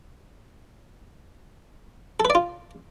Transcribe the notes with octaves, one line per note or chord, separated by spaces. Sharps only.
A4
B4
D5
F4